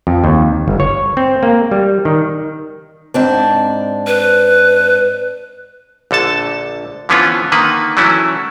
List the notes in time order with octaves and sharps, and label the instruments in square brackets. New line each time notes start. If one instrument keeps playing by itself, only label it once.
[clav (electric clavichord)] F2
D#2
G1
C#5
C4
A#3
G3
D#3
[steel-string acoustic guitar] G#2 C4 D4
[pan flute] B4
[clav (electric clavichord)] A#1 D3 A4 A5
D3 E3 F3 B3 C#4 F4
D3 D#3 A#3 B4
E3 F#3 A3 C#4 E4